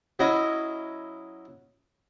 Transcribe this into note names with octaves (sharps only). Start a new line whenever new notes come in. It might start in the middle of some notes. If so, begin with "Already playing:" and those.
F#3 C#4 E4 D#5